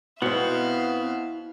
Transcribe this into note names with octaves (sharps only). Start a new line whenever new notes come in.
B2 B3 C4 E4 C5 E5 F5 C#7